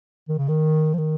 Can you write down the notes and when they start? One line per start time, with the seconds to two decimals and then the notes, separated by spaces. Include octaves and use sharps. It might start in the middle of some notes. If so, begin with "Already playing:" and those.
0.29 D#3
0.38 C#3
0.48 D#3
0.93 F3
0.98 D#3